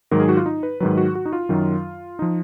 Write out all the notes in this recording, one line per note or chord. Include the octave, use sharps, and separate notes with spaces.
G#2 D#3 F#3 A#4
G#4
F#4
F4
D#4
B4
G#2 D#3 F#3 B4
F#4
F#4
D#4
F4
F#2 D#3 F#3
F3 D#4